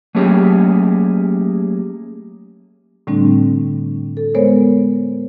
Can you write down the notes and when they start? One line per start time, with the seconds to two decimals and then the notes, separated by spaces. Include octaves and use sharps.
0.15 F#3 A3 A#3 C#4 G4 G#4
3.07 A2 D3 G3 A3 C4 D4
4.17 A4
4.35 G#3 B3 A#4 C5 C#5